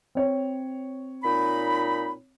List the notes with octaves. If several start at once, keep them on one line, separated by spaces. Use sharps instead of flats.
C4 C#5
A#2 D#4 B5